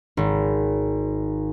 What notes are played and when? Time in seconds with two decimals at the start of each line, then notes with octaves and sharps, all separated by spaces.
0.17 G#1